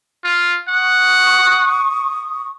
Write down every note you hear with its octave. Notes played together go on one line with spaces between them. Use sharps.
F4
F#5 C#6 D#6